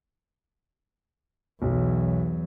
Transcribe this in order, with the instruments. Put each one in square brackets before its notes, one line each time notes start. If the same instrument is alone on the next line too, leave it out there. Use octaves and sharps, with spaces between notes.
[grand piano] B1 [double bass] E2 F#3